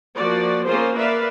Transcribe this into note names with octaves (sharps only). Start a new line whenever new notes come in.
F3 A#3 F#4 D5
A#3 C#4 F4 G#4 A#4 C5
A#4 B4 D5 E5 F5